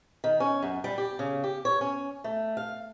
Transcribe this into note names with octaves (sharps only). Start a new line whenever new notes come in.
D#3
C#4
F#2
G3
G4
C#3
G4
C#5
C#4
A3
F5